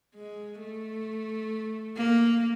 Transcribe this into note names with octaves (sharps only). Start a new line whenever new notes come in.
G#3
A3
A#3